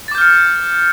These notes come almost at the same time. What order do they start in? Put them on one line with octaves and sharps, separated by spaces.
A6 D6 G6 F6 C#7